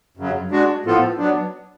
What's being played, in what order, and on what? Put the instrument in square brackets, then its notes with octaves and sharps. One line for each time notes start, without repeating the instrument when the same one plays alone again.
[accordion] F#2 C#3 F#3
G#3 D4 F#4
A2 F3 B3 F4 A4
F#3 B3 D4